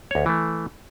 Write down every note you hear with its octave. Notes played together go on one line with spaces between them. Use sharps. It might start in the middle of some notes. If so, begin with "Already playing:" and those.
D2 C#5
E3 A3